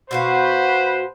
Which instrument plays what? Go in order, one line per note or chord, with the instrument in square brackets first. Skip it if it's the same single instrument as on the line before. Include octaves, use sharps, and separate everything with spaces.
[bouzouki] B2 F#4 F5 [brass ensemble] B4 C5